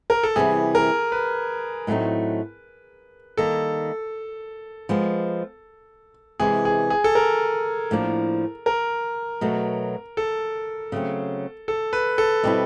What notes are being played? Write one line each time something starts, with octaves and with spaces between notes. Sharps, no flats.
A#4
A4
C3 E3 G3 B3 E4 G#4
A#4
B4
A2 F#3 A3 C4 D#4
D#3 G3 A#3 A4
F3 G#3 B3
C3 E3 G#3 B3 G#4
G#4
G#4
A4
A#4
A2 F3 A#3 D4
A#4
B2 F#3 A3
A4
C#3 F#3 A3 C4
A4
B4
A4
B2 G3 C4 E4